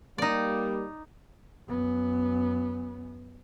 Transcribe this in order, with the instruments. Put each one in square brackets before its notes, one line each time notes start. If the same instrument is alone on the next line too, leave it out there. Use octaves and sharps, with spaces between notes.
[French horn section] G3 A#3 [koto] D#4 D5
[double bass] F#2 B3